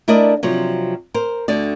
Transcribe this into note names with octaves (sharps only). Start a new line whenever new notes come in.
A3 D4 E4 A#4 D5 D#5
C3 F3 F#3
A#4 C5
D2 D3 D5